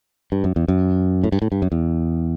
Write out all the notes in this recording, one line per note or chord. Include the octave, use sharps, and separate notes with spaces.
G2
F#2
E2
F#2
A2
G2
A2
G2
F#2
E2